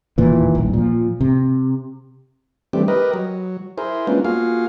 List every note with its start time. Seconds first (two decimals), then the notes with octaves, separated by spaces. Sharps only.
0.18 E1 D#2 A#2 E3
0.55 D#1 A#1
0.73 A#2 F3
1.20 C3
2.73 E3 G3 A3 C4 D4 G4
2.88 G4 A#4 B4 D#5
3.14 F#3
3.78 E4 G#4 A#4 C5
4.07 G#3 A#3 B3 C#4 D4 F4
4.25 A#3 F4 F#4 G#4 F5